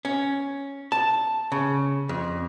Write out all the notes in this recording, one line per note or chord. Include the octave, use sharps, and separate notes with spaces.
C#4
A5
C#3
F2